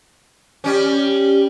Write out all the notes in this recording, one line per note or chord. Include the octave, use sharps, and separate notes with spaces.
G3 C#4